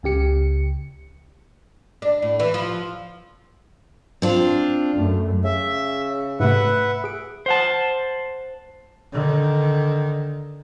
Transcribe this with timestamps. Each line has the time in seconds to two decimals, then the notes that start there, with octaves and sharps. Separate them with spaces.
0.03 C#2 C#3 G4 C#7
2.02 D4
2.22 A2
2.40 E3
2.54 F3
4.22 C4 D4 F4
4.94 F#2 A3
5.44 C#3 E5
6.40 G#2 C3 A3 B4 E5 F#5
7.04 G#4 D7
7.46 C5 F#5 A5
9.12 D3 D#3